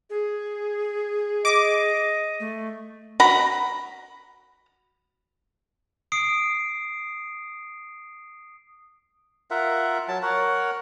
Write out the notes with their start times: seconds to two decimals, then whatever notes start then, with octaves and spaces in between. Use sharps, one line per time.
0.10 G#4
1.45 D#5 D6
2.40 A3
3.20 F#4 A#5 B5
6.12 D#6 C7 D7
9.51 F4 A#4 E5 F#5
10.08 F#3 A5
10.22 A#4 C#5 F#5